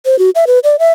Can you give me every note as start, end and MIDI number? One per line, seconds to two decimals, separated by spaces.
0.06 0.18 72
0.19 0.30 66
0.35 0.45 76
0.47 0.59 71
0.64 0.76 74
0.79 0.93 76